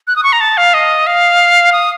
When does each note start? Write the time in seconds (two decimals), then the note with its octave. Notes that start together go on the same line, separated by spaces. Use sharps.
0.07 F#6
0.16 D#6
0.23 C#6
0.33 A#5
0.40 A5
0.57 F5
0.74 D#5
1.07 F5
1.72 D#6